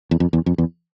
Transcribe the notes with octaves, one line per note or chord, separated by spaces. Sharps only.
E2
F2
E2
F2
E2